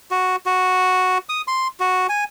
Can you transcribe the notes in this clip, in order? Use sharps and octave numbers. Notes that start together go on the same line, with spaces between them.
F#4
F#4
D#6
C6
F#4
G#5